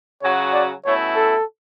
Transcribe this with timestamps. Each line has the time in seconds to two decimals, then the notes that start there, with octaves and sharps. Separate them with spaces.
0.22 C#3 F#3 C#4 F#4 C#5
0.53 D5
0.85 B2 A3 C#4 E4 C#5
1.16 A4